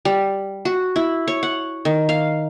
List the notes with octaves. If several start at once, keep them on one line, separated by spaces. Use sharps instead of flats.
G3
F#4
E4
C#5
F#5
D#3
F5